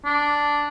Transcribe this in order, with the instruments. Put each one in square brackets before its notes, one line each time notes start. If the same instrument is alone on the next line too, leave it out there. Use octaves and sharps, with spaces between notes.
[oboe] D4